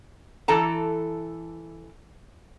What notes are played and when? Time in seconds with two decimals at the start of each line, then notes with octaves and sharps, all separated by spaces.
0.48 E3 A4 A5 A#5